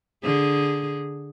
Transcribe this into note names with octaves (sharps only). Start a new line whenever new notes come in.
D3 G#4